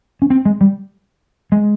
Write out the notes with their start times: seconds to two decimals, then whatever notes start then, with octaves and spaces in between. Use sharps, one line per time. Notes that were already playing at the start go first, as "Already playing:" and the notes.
0.22 C#4
0.30 C4
0.46 G#3
0.61 G3
1.52 G#3